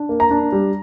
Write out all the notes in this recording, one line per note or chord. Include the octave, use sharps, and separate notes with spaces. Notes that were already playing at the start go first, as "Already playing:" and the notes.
Already playing: D4
A#3
A#5
D4
G3